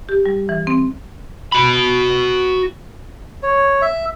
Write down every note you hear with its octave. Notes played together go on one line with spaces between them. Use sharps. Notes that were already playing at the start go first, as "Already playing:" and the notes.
G4
G3
E3
C4
F#4 B5
C#5
E5